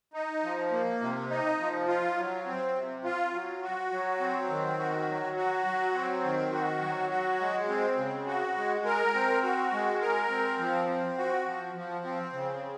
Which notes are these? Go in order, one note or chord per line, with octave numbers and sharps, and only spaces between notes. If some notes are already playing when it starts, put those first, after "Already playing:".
D#4
F3
A#3
C3
D#4
F3
F4
F#3
C4
C3
F4
F#3
F#4
F#3
C4
D#3
F#4
F#3
F#4
F#3
C4
D#3
F#4
F#3
F#4
G#3
C4
C#3
F#4
G#3
A#4
C4
F#4
G#3
A#4
C4
F3
C4
F#4
F3
F3
C4
C#3